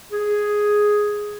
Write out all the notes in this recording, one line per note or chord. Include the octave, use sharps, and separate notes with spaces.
G#4